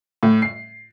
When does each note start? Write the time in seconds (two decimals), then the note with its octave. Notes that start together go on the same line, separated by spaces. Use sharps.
0.23 A2
0.42 C7